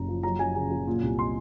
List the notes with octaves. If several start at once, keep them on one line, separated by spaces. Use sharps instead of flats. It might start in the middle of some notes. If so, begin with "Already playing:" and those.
Already playing: F#1 F#2 A#5
F3
F#3 A#5
F#3 G#5
C#3 G#5
F#3
A#2
C2
C6